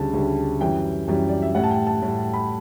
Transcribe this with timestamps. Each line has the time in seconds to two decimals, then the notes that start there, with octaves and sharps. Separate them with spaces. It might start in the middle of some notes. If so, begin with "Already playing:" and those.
Already playing: D2 C#3 G3 A5
0.13 D2 C#3 G3
0.60 F#2 E3 G3 G5
1.08 F#2 E3 G3
1.29 D5
1.42 E5
1.55 A2 G3 F#5
1.64 A5
1.71 G5
1.87 A5
2.02 A2 G3
2.33 B5